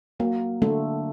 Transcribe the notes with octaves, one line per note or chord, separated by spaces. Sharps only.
F#3 A#3
D3 A3